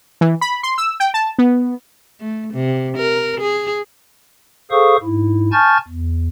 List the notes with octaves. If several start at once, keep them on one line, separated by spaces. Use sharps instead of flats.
E3
B5
C6
E6
G5
A5
B3
A3
C3
A#4
G#4
G#4 A4 C5 F5 C#6 D#6
G#2 E4
G#5 A5 C#6 F6 G6 A6
E2